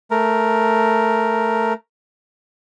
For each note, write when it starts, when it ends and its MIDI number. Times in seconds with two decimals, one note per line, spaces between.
0.11 1.73 57
0.11 1.73 70